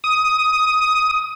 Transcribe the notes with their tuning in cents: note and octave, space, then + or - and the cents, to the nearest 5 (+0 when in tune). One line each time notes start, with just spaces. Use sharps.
D#6 +10